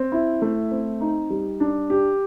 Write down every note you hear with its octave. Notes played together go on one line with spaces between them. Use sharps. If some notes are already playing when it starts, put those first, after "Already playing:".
Already playing: C4
E4
A3
C4
D#4
G3
D4
G4